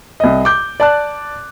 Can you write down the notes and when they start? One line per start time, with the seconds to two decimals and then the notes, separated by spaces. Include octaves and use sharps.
0.20 C2 D#5
0.45 D6 G6
0.80 D5 A5 F#6